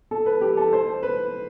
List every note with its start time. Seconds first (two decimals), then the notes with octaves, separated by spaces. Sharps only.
0.11 A4
0.26 B4
0.41 G4
0.57 A4
0.73 C5
1.03 B4